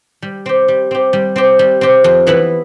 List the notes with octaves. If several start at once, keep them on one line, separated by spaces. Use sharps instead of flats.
G3
C4 G4
G3
C4 G4
G3
C4 G4
G3
C4 G4
F2
E3 B3 E4 B4